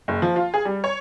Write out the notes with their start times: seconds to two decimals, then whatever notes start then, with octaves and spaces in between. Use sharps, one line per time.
0.08 F#1
0.22 F3
0.36 F4
0.54 G#4
0.65 G3
0.84 C#5